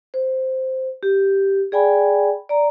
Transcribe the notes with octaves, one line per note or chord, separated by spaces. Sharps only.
C5
G4
G#4 D5 G5 G#5 B5
D5 A#5